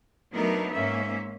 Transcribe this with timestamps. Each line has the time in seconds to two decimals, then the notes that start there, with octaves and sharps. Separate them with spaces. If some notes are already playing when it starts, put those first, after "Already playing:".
0.33 F#3 A3 B3 D4 D#4 A#4
0.74 G#2 A#3 C#4 E5